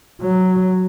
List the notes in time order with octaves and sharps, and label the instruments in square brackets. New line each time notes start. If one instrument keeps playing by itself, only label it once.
[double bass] F#3